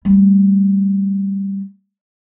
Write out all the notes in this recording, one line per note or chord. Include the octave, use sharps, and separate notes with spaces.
G3 A3